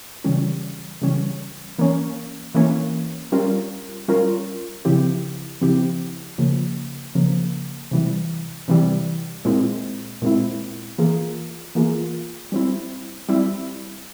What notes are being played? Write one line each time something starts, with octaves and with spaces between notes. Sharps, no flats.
C#3 E3 G3 C#4
C#3 E3 G3 C#4
E3 A#3 C#4
E3 A#3 C#4
G3 C#4 F4 A#4
G3 C#4 F4 A#4
C#3 F3 C4 E4 G4
C#3 F3 C4 E4 G4
C#3 F3 A#3
C#3 F3 A#3
C3 E3 G3
C3 E3 G3
A#2 G#3 C4 E4
A#2 G#3 C4 E4
E3 A#3 F4 G#4
E3 A#3 F4 G#4
G3 C4 E4
G3 C4 E4